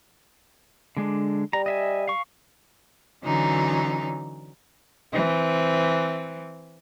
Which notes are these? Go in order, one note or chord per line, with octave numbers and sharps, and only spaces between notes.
D3 G#3 D4
G3 A#5
D#5 E5 G#5
F5 C#6
D3 E3 F#3 C#4 D#4
E3 C4